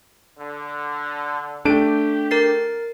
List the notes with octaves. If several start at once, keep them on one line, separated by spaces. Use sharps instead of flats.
D3
A3 D4 G4 D7
A#4 A6 C7